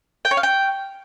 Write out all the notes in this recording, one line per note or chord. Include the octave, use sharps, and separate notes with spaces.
G5
C#5
F5
G5